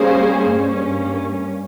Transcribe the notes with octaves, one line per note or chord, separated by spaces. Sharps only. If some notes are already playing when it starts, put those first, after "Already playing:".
Already playing: G3 A#3 C#4 G#4 C5
G2 G3 A#3 C#4